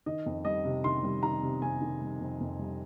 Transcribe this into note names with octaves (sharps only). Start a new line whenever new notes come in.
D#3 D#5
F2
G3 D#5
C3
D#3 C6
G3
D#3 A#5
C3
F2 G#5
D#3
G3
F2
F2
G3